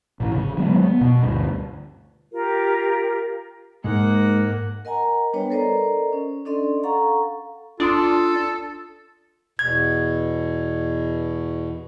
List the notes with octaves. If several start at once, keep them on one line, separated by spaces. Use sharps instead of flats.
A1 A2
C#3
D#3 F#3 G#3 B3
B3
B2
D2 G2
F4 G4 A#4
G#2 G#3 A#3 F#5
A#4 D#5 F#5 G#5 A#5
G3 B3 D4 B4 C#5 G5
A4 A#4 C5 D5 D#5 A#5
C#4
C#4 D4 A4 D5 D#5 C6
A4 F5 F#5 A#5 C#6
D4 F4 A4 C6 D#6 A6
E2 B2 G#6